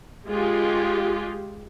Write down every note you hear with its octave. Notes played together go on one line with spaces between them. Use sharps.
G#3 F4 G4 G#4